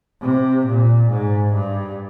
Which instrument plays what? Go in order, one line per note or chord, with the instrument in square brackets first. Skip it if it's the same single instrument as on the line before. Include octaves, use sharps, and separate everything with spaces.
[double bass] C3
A#2
G#2
G2